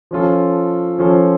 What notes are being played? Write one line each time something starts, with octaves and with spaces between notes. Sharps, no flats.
F3 C#4 F4 A4
F3 C#4 F4 A4